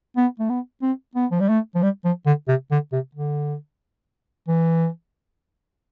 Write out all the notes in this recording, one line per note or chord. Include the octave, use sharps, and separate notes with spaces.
B3
A3
B3
C4
B3
F3
G3
A3
F3
G3
F3
D3
C3
D3
C3
D3
E3